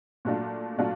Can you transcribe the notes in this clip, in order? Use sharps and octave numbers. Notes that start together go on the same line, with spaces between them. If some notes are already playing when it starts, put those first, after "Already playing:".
A#2 F#3 A3 D4 F4
A#2 F#3 A3 D4 F4